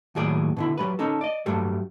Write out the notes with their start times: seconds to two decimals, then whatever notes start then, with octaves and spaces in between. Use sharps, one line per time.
0.15 D#2 A2 F#3 G#4 D5
0.57 B2 D3 E4
0.78 F#3 G3 B4
0.99 C#4 D#4 A4
1.21 D5 D#5
1.46 G2 F#3 G3 A3